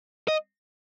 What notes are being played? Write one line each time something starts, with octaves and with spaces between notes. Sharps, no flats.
D#5